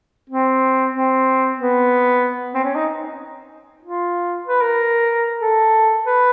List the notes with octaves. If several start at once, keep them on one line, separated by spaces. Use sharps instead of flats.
C4
C4
B3
C4
C#4
D#4
F4
B4
A#4
A4
B4